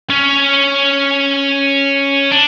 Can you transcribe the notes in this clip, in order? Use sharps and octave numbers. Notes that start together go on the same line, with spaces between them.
C#4
D4